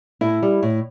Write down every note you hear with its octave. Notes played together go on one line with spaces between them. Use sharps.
A2 E4
G3
A2